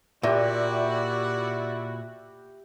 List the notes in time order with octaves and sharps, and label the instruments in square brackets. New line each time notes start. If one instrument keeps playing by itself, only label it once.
[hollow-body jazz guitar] A#2 [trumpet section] E4 F#4 [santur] G4 E5 [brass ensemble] D5